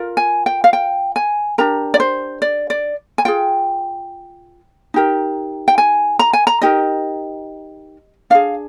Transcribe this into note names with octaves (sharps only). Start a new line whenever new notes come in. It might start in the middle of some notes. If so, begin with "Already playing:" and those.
Already playing: F4 A#4
G#5
G5
F5
G5
G#5
D4 G4 A#4 A#5
D5
C5
D5
D5
G#5
F4 G#4 G5
D#4 G4 A#4
G5
G#5
A#5
G#5
A#5
D#4 G4 A#4 D#5
D4 G#4 F5